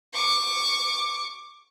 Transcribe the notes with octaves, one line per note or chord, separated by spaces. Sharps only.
C#6 D6